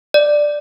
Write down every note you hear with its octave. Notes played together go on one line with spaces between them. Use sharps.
D5